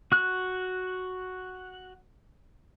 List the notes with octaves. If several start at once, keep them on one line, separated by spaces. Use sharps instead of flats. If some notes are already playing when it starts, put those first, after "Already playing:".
F#4 F#6